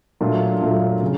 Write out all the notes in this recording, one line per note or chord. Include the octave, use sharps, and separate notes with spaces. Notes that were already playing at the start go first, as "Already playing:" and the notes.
A#2 F#3 A3 D4 F4
A#2 F#3 A3 D4 F4
C#3